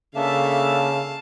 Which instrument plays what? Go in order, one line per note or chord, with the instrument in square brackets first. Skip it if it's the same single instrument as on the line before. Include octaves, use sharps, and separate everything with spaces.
[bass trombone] C#3 [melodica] A#3 D4 [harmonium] A4 E5 [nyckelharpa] F5 A5